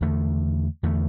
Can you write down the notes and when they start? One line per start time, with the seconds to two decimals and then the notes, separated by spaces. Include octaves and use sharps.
0.01 E2 D3 A3
0.83 E2 D3 A3